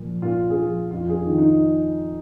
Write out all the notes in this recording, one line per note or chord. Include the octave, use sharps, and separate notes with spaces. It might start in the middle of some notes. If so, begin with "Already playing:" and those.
Already playing: A#2 F3
A#2 F4
G#4
F3 F4
F2 F4
G#4
F4
D#3
D#4